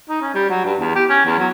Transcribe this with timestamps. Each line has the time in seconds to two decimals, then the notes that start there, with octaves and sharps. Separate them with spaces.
0.09 D#4
0.21 C#4
0.35 G3
0.50 F#3
0.65 G2
0.80 E2
0.95 G4
1.10 C#4
1.26 E2
1.39 F#3